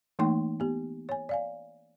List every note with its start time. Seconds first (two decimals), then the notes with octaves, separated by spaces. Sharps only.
0.19 E3 A3 A#3 D#4 G5 C6
0.60 B3 G4
1.09 C#5 G#5
1.29 D5 F5 G#5